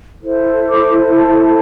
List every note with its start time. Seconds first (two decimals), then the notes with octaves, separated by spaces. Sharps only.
0.22 E4 A4 C5
0.69 D6
1.15 A5